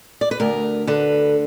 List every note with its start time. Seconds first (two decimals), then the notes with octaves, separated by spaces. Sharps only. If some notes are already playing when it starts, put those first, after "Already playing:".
0.21 D5
0.31 B4
0.40 D2 A#4
0.87 D3 B4